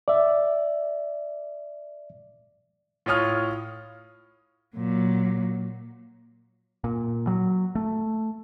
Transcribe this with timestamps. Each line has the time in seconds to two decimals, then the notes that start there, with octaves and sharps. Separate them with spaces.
0.08 D5 E5
3.06 A2 F4 C#5 D#6 F6
4.76 A#2 F#3
6.84 A#2
7.27 F#3
7.75 A3